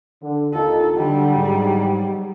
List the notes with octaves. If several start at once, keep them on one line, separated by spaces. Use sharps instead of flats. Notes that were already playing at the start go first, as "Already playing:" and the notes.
D3
D#2 D#4 F4 A4
D3 F#3 G3
G#2